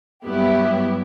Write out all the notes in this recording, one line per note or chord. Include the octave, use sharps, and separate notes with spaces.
G2 F#3 B3 E4 G4